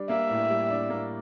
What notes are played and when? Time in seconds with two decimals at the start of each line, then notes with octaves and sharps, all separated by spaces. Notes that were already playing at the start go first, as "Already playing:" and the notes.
Already playing: G3 D4
0.09 A#3 E5
0.30 A2
0.50 G3
0.70 D4
0.90 A#3